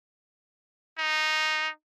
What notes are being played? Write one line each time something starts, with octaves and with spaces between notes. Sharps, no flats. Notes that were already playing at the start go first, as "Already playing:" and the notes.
D#4